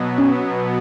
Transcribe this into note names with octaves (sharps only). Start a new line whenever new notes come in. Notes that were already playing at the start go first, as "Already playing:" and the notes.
Already playing: B2 F#3 B3
C#4